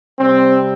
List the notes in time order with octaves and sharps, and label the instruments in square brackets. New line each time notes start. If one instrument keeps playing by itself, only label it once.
[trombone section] C3 G3 C4